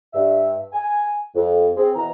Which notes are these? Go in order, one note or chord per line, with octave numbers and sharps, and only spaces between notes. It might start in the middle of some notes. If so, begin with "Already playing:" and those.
G2 E5
G#5
F2
C4 G#4
B2 E3 A#5